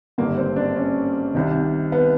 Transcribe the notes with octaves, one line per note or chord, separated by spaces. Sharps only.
G#1 G2 D3 A#3
C4
D4
C#4
C2 C3 D#3
B3